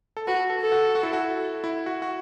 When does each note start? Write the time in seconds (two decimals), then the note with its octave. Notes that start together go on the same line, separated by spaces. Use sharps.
0.17 A4
0.27 F#4 B4
0.50 A4
0.61 A4
0.72 F#4
0.95 F#4
1.03 E4
1.13 F#4
1.64 E4
1.86 F#4
2.02 F#4